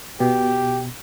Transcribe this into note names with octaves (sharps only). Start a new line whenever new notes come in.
B2 G4